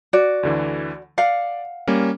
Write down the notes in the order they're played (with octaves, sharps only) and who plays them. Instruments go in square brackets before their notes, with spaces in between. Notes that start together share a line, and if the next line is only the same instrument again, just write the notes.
[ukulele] F#4 D5
[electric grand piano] D2 D3 E3
[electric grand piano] D5 [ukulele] F5 F#5
[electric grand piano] G3 A#3 C#4